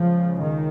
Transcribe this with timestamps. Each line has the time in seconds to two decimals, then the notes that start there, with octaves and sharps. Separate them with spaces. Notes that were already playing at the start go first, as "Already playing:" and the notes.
Already playing: C#2 C#3 F3
0.40 D#3